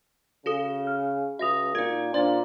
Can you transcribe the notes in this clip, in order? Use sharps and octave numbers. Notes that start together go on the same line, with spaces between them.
C#3 F#4 A4 D#6
F6
C#2 F#4 E5 D#6 A#6 F7
A#2 D#4 A#4 G#6
A#2 D4 C5 D5 C6 A6